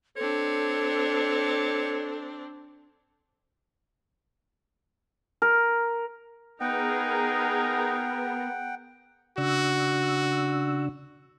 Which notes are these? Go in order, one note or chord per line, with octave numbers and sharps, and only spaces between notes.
C4 D4 A4 C#5
A#4
B3 D#4 G#4 A#4 F#5 G5
C#3 D4 F#4 E6